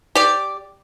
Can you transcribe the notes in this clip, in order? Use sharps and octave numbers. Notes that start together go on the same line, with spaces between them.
G4 D5